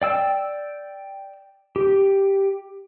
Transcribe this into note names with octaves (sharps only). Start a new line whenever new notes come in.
D5 G5 E6
G4